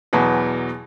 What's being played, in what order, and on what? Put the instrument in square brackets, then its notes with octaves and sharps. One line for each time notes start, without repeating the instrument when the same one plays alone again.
[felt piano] E2 B2 E3 F#3